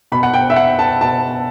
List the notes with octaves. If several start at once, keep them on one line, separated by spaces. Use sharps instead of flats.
B2 B5
F#5
G5
E5
F#5
A5
B2 A5